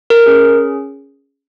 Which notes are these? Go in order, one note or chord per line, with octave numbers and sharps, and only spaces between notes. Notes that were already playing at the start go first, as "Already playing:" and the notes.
A#4
C#4 G#4